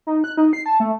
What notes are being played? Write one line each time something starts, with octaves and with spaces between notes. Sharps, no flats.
D#4
F#6
D#4
C7
A5
A3